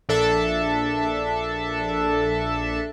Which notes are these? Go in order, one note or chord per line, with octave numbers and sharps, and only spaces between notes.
A#1 D4 A4 E5 A5